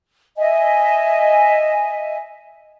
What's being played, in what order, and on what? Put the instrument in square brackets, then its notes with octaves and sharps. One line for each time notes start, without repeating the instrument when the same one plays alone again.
[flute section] D#5 E5 G#5